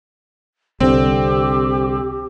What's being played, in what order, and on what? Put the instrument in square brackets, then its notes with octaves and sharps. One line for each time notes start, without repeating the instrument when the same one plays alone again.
[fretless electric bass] C2 D3 [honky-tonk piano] C4 [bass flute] G4